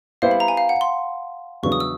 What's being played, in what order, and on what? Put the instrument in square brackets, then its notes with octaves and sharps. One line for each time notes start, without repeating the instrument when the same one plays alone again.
[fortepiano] G3 B3 E4 G4 C5 [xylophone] F5
[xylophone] B5
A#5
G#5
F5
F#5
C6
[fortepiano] E2 C#3 F#3 B3 D4 [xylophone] C#6
[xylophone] D#6
E6